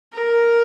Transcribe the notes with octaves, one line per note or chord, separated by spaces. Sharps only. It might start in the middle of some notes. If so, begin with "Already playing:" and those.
A#4